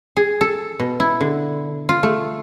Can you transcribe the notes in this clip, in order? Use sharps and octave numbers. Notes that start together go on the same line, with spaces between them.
G#4
A4
B2
E4
D3
F4
A3